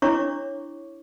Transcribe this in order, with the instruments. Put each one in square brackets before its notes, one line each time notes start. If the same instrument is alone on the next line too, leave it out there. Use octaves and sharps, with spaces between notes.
[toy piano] D4 E4 C#5 C#6 D6